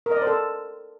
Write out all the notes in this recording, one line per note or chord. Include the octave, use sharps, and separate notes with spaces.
A#4
D#5
D5
C5
A4